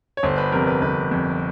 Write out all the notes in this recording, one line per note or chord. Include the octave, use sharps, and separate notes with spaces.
C#5
G1 C5
B4
F2 C3 A#4
B4
G1 B4
F2 C3